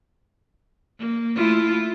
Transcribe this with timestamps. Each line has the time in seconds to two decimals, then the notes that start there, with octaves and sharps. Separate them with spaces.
0.98 A#3
1.35 A3 E4 F4